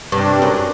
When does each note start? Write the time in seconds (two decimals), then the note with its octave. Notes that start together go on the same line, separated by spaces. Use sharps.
0.12 G2 C3 G3 D4
0.42 F#2